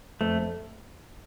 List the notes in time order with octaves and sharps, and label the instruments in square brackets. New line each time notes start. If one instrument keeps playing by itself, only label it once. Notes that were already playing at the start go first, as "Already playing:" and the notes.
[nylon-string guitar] F2 [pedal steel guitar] A3